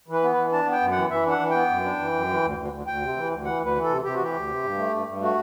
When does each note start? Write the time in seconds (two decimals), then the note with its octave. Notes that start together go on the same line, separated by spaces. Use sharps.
0.08 E3 B4
0.23 B3
0.32 E3 B4
0.52 D4 A5
0.66 B3
0.72 G5
0.81 F#2
0.91 F#5
0.97 E3
1.10 E3 E5
1.26 D4 F#5
1.40 E3
1.50 B3 G5
1.69 F#2
1.84 D4
1.99 E3
2.13 F#2
2.29 E3
2.43 D2
2.57 D2
2.72 D2
2.86 D2 G5
3.02 C3
3.17 E3
3.30 D2
3.45 E3 F#5
3.60 D2
3.65 B4
3.75 E3
3.84 A4
3.90 C3
4.05 C3 G4
4.14 F#4
4.19 E3 G4
4.34 D2
4.48 C3
4.63 G2
4.78 A3
4.92 G2
5.07 G2
5.21 A3 F#4